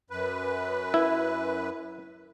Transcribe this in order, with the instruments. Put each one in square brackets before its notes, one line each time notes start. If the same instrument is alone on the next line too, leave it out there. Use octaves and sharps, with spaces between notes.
[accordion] F#2 B4
[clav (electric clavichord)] E4